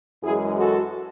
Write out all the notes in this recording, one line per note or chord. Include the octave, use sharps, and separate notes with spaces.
F#2 E3 G#3 E4 G#4
F#4 A4